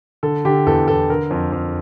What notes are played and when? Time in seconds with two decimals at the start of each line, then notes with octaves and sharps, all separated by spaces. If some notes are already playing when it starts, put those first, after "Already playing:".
0.23 D3 A4
0.45 D3 G4
0.66 E2 A4
0.88 E2 A4
1.09 D3 A#4
1.31 F2
1.52 F2